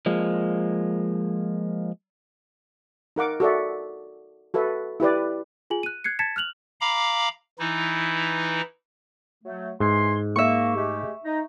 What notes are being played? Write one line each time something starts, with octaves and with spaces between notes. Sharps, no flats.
F3 G#3 A#3
D#4 A#4 F#5 D6
F#4 A4 D5 E5
F#4 A4 B4 E5
E4 G4 B4 D5
F4 G#4 G#5 F#7
F#6 D#7
F#6 G#6 C7 C#7
A5 G#6 A6 B6 C#7 E7
F6 F#6 F7 F#7
F5 A#5 B5 D6
E3 D#4 E4
F#3 A3
G#2 E3 G#5 C6
A#3 E5 C#6
G#3 A3 G4
D#4